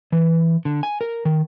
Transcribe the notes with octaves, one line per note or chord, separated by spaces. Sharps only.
E3
D3
G#5
A#4
D#3